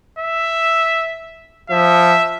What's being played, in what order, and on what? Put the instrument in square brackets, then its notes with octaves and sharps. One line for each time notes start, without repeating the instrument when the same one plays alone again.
[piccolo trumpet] E5
[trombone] F3 [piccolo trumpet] E5